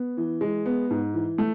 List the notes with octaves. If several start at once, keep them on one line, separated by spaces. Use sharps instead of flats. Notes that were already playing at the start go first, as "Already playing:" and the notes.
Already playing: B3
E3
G#3
B3
G#2
E3
A3